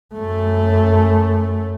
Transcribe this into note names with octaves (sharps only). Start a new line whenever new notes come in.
F#2 A3